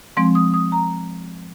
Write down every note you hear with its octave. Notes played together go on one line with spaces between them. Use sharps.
F3 G#3 C4 C6
D#6
D#6
A#5